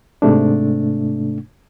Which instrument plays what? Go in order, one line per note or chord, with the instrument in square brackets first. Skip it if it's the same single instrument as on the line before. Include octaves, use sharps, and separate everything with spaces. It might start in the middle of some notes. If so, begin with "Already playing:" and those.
[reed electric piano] G#2 C3 A3 D4